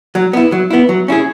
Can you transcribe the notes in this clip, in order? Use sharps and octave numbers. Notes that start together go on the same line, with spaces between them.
F#3
B3 E4
F#3
B3 E4
F#3
C#4 E4 G#4